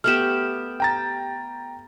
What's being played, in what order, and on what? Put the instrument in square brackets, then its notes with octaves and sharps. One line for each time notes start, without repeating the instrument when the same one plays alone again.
[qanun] A3 B3 G4 [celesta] F6 E7
[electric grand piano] G5 A#5 A6